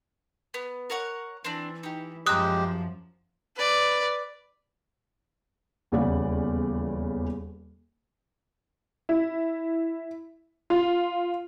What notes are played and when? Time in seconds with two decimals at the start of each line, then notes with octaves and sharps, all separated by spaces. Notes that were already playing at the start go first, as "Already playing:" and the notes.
0.54 B3
0.90 A#4 C#5 F#5
1.45 E3 C4 D4
1.83 D#4 G4
2.26 F#2 F3 G#3 G4 C5 A#5 D#6 F#6
3.56 B4 D5
5.92 D#1 E2 C#3 C#5 D5 F#5
9.09 E4
10.70 F4